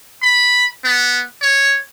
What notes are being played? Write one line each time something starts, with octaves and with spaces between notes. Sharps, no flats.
B5
B3
C#5